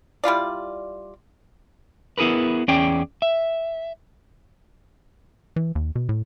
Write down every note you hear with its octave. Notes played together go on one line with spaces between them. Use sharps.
G3 E4 F4 D5
B3 E4 G#4 A#4 B4
E2 C#4 G#4 D5 G5
E5
E3
D#2
B2
A2